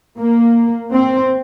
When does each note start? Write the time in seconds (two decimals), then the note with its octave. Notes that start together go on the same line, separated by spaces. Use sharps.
0.19 A#3
0.94 C4